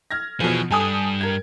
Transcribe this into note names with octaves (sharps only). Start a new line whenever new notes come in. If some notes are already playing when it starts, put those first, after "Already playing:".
F6 G#6 A#6
B2 E3 F3 G#4
G2 G3 A4 G#5 D#6
A#4 G#6